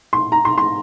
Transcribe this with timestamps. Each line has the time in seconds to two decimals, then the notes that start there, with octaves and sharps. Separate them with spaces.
0.13 C6
0.32 A#5
0.45 C6
0.58 C6